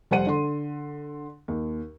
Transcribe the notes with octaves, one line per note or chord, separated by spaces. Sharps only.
F1 G3 A4 C5 F#5 D#7
D3 C6
D#2